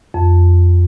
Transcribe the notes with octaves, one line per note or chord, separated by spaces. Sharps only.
F2